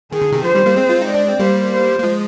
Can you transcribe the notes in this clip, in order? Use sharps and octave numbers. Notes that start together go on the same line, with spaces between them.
D#3 G#4
D3
C3 D#3
D3 F3 C5
D#3 G3
G3 A#3
G#3 C4
F4
D#4
D5
D4
C4
G3 A#3 C5
C5
A#3
F3 G#3